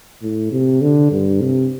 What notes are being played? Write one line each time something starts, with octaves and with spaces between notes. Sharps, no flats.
A2
C3
D3
G2
C3